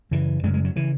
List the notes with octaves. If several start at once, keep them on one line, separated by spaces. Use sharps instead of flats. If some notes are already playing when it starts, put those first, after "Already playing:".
F#2 C#3 E3
F#2 C#3 G#3
G#3
F#3
C#3 E3